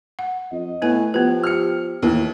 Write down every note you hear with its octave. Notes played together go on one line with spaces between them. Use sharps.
F#5
F2 D#5
A2 B3 B4 G#5
F3 B3 G4 B4
F6 C#7
D#2 A2 E3